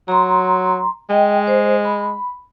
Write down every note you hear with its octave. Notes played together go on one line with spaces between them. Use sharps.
F#3 A#5 C6
G#3 D#5 G5
C5
B5